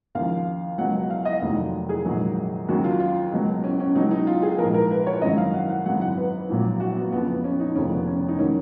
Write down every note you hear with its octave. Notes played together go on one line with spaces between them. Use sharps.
D#2 C#3 F3 F5
C#2 B2 F#3 F#5
F5
D#5
F1 D#2 D#3 F#3
G#4
A#1 G#2 D#3 F#3
D#2 C#3 F#3 F#4
F4
F4
C#2 B2 F#3
C#4
C#4
C#4
C#2 B2 F#3 D#4
D#4
F4
G#4
A#1 G#2 F3 A#4
A#4
B4
C#5
G#1 F#2 D#3 F#3 D#5
F5
F#5
F#5
G#1 F#2 C#3 F#3 F#5
F#5
B4
A#1 A#2 F#3
F#4
B3
F2 C#3 F3 B3
B3
C#4
D#4
F1 D#2 C#3 F3 C#4
B3
C#4
D#4
D#3 F#3 C#4